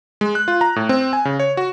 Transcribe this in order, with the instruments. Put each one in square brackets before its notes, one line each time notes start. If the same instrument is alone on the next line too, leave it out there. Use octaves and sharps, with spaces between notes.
[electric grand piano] G#3
F#6
F4
A#5
A2
C4
G#5
C#3
C#5
F#4